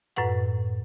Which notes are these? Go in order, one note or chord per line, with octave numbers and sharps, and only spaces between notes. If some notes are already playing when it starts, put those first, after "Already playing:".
F#2 A2 B4 F#5